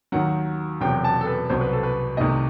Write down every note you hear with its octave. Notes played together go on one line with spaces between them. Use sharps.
D#2 D#3 F#3 F#5
E1 E2 C3 F#3 G5
A5
A4
B4
C2 B2 F#3 C5
B4
A4
B4
C2 C3 D#3 A3 D#5